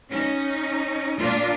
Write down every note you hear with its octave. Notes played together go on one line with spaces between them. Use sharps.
C#4 D#4
A#2 A#3 D4 F4